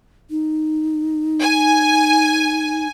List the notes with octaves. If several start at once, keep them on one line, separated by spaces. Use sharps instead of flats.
D#4
G#5